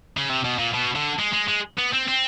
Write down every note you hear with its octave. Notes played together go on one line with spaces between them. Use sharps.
C#3
C3
B2
A#2
B2
D3
G#3
G#3
G#3
B3
C4
C4